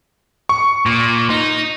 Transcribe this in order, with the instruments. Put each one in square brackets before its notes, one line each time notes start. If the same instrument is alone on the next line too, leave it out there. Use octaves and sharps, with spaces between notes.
[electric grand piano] C#6
[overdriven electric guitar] A#2
D#4